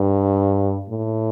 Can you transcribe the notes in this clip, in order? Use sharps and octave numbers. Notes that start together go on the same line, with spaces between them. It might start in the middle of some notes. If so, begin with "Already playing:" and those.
Already playing: G2
A2